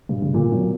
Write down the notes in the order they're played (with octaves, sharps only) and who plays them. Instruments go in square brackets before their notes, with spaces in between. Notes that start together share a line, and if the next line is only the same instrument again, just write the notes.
[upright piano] G2 [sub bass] B2
[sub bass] C#3
[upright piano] A#2 [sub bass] D3
[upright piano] B2 [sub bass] F#3